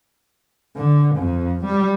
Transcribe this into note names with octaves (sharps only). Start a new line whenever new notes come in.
D3
F2
G3